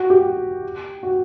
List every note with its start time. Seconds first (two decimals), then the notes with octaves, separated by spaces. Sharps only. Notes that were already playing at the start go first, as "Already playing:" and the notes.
Already playing: F#4
0.10 G4
1.03 F#4